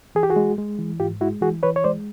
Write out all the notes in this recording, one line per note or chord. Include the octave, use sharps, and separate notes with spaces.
E3 G#4
G4
F#4 G#4
G#3
G#3
E3
G#2 F4 G4
G#3 E4 F#4
E3 F#4 G#4
E3 B4 C#5
C#5
G#3 C5 D5